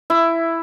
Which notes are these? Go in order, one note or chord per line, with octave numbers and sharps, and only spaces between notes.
E4